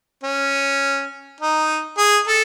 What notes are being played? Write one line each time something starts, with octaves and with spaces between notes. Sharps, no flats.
C#4
D#4
G#4
A4